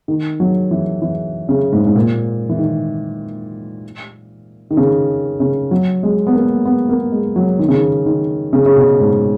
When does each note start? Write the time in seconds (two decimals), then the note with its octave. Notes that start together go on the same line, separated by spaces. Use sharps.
0.08 D#3
0.40 F#3
0.71 E3
1.02 E3
1.49 C#3
1.72 G#2
1.86 G#2
1.96 A#2
2.49 E3
2.59 D#3
4.71 D#3
4.77 C#3
5.40 C#3
5.71 F#3
6.03 G#3
6.27 B3
6.34 A#3
6.65 B3
6.89 A#3
7.12 G#3
7.36 F#3
7.59 D#3
7.68 C#3
7.78 D#3
8.06 D#3
8.53 C#3
8.66 C#3
8.77 B2
9.00 G#2